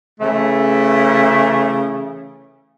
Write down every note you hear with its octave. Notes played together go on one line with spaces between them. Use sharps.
C#3 E3 A3